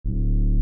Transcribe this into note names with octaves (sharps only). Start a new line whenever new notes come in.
D1